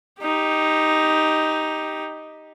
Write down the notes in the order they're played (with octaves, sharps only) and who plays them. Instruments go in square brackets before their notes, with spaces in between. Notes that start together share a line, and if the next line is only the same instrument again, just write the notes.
[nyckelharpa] D#4 G4